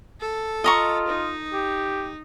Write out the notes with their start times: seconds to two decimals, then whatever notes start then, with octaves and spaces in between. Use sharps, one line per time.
0.21 A4
0.64 F4 D#5 A#5 C#6
1.08 D#4
1.53 G4